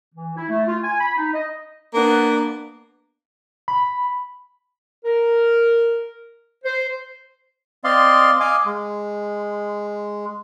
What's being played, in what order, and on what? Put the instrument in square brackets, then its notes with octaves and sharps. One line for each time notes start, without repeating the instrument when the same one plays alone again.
[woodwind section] E3
E4
A3
F4
G#5
B5
D#4
D#5
[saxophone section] A#3 B3 D4
[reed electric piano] B5
[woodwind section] A#4
C5
[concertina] C4 D5 D#5 F5 C6
D#5 F5 G#5 D6
G#3